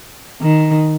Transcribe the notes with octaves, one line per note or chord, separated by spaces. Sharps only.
D#3